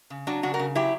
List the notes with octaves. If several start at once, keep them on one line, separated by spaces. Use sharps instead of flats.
C#3
F#3 D4 F#4
C#3 D4 F#4
F#4 A#4
C#3
F#3 E4 G4